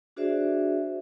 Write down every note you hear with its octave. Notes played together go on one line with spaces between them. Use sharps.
D4 F#4 G#4 C5 D5 E5